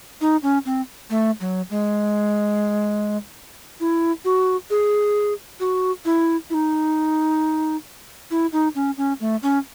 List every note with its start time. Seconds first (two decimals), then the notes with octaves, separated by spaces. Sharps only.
0.21 D#4
0.43 C#4
0.66 C4
1.10 A3
1.41 F#3
1.70 G#3
3.80 E4
4.25 F#4
4.70 G#4
5.60 F#4
6.05 E4
6.50 E4
6.54 D#4
8.31 E4
8.53 D#4
8.75 C#4
8.97 C#4
9.20 A3
9.43 C#4